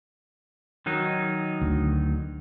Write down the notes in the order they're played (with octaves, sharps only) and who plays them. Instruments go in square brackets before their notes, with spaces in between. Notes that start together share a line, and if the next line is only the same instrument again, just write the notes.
[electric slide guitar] D#3 F#3 D#4
[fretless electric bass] D2